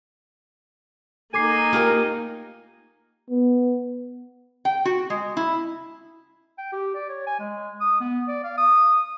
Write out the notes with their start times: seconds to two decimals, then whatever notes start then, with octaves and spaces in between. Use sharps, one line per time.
1.34 A#3 D#4 A4 G#5 D6 C7
1.73 F4 G4 A#4
3.30 B3
4.65 G5
4.85 F#4
5.10 G#3
5.37 E4
6.58 G5
6.72 G4
6.95 D5
7.09 C#5
7.27 G#5
7.40 G#3
7.81 D#6
8.01 B3
8.28 D5
8.44 F5
8.58 D#6